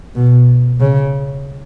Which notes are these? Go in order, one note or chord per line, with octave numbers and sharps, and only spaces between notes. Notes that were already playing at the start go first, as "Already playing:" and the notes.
B2
C#3